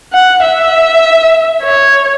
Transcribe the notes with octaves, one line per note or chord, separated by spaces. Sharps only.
F#5
E5
C#5